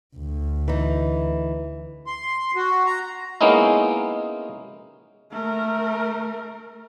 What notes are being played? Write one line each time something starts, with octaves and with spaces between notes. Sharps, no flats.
D2
E3 D#4
C6
F#4
A#5
G#3 A#3 B3 C#4 D#4 E4
A3 A#4